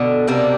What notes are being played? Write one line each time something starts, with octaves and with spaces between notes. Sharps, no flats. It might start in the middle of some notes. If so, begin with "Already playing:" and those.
Already playing: B2 D3
C3 G3 A#3 D4